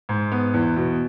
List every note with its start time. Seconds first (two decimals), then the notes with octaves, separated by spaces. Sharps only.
0.09 G#2
0.32 B3
0.54 E2
0.76 B2